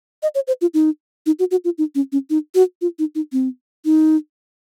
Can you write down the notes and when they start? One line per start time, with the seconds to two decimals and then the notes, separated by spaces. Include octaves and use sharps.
0.23 D#5
0.35 C#5
0.47 C5
0.61 F4
0.74 D#4
1.26 D#4
1.39 F#4
1.51 F#4
1.65 F4
1.78 D#4
1.95 C#4
2.12 C#4
2.30 D#4
2.55 F#4
2.81 F4
2.99 D#4
3.15 D#4
3.32 C4
3.85 D#4